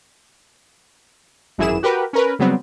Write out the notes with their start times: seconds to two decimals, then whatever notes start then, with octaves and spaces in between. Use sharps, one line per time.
1.58 G#1 F#2 E3 E4 G#4 E7
1.83 F#4 G4 A#4 B4
2.13 C#4 A#4 B4
2.39 C#3 F#3 G3 B3 C4